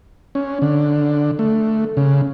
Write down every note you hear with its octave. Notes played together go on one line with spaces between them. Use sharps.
C#4
D3
A3
C#3